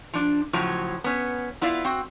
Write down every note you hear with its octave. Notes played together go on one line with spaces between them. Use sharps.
F3 D4
A2 C#3 F3 F#3
B3 C#4
B3 E4 F4 D5 F5
C4 F#4